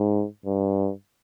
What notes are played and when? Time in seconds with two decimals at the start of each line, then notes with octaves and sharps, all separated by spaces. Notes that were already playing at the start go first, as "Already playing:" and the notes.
Already playing: G#2
0.46 G2